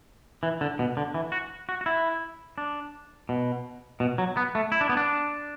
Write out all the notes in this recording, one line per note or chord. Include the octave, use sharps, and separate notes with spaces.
E3
D3
B2
D3
E3
F#4
F#4
F#4
E4
D4
B2
B2
F#3
B3
A3
E4
D4
B3
D4